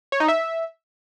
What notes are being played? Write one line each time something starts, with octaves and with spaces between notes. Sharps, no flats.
C#5
D#4
E5